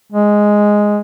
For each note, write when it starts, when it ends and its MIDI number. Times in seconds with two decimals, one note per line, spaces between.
0.12 1.00 56